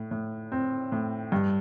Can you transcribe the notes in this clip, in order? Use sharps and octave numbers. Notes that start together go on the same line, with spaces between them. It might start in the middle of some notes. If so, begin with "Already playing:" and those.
Already playing: A2
A2
C4
A2
G2